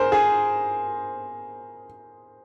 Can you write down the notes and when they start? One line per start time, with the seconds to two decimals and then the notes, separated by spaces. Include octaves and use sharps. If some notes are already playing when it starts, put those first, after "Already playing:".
Already playing: G#4 A#4 C5
0.12 G#4